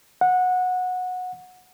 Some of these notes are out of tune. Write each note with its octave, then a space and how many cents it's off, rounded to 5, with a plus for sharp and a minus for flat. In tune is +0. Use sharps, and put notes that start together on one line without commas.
F#5 -20